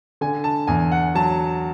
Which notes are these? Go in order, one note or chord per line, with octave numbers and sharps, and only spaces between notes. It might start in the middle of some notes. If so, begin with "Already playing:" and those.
D3 G#5
A5
E2 G#5
F#5
F#3 A5